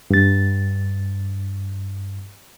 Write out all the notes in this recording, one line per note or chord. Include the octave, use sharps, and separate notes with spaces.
G2 A6